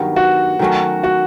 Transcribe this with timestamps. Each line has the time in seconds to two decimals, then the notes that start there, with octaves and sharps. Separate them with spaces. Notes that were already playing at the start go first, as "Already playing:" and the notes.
Already playing: G2 D#3 F#3 B3
0.16 F#4
0.59 D#3 F#3 A3 C#4
1.03 F#4